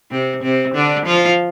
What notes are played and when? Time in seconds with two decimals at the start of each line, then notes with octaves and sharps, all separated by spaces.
0.11 C3 C4
0.43 C3 C4
0.75 D3 D4
1.06 F3 F4